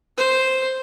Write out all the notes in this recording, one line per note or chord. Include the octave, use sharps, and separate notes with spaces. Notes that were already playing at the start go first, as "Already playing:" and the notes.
C5